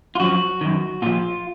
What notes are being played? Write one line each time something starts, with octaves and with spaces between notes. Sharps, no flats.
F4
F#2 F3 F#4
F#2 D#3
A#2 F3 F4